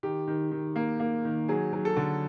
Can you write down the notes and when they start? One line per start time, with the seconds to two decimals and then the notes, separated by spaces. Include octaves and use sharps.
0.03 D#3 G4
0.27 D#3
0.51 D#3
0.76 A#3
1.00 A#3
1.25 D#3
1.48 F#3 G#4
1.73 F#3
1.85 A4
1.97 D3